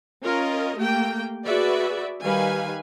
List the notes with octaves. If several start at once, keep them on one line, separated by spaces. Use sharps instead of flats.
C#4 F4 A#4 D#5
A3 A#3 G4 G5
F#4 G#4 B4 D5 E5
D#3 G3 B4 F5 G#5